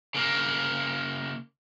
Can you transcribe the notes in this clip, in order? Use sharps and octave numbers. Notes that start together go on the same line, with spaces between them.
C#3 A#3